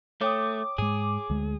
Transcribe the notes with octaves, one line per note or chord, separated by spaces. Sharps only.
A3 C#5 G5 D6 D#6
G#2 G#3 G#4
D2 G#3